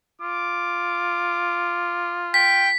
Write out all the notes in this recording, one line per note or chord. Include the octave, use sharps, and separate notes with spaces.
F4 D6
G5 B6